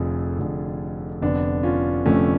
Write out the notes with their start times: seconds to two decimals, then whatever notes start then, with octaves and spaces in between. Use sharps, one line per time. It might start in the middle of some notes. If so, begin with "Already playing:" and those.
Already playing: F1 F2 D3 F4 G#4
0.39 F1 F2 D3
1.22 F1 F2 D3 B3 D4
1.63 C#4 F4
2.06 F1 F2 D3 A3 C#4